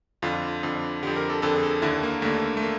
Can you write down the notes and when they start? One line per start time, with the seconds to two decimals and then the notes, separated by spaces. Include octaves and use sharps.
0.22 F2 D3 F4
0.63 F2 D3
1.03 D3 G4
1.07 F2
1.16 A#4
1.30 A4
1.42 F2 D3 A4
1.56 G#4
1.63 A4
1.82 D#2 D3 E4
2.03 A#3
2.22 D#2 D3 A3
2.57 A3
2.62 A#3